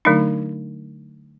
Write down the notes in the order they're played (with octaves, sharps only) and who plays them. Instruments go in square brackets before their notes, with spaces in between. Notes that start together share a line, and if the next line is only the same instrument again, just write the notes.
[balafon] D3 F#3 A3 D4 D#4